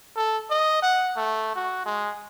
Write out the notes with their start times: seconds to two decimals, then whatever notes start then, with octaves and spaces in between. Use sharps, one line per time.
0.16 A4
0.50 D#5
0.82 F#5
1.16 A3
1.55 F#4
1.86 G#3